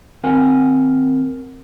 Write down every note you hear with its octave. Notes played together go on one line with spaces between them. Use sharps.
D#2 C4 A#4 F#5 G#5